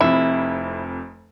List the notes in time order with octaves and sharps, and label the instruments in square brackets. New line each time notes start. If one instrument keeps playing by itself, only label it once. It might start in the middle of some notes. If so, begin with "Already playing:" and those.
[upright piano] F1 F2 [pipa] E4